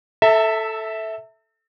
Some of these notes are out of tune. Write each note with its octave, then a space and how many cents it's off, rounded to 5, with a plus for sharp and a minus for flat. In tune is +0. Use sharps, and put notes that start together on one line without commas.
A4 +0 E5 -10 A5 +45